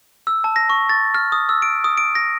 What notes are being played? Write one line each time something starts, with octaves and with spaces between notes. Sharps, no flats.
E6
A5
A#6
C#6
A6
F6
D#6
E6
D7
D#6
D7
A#6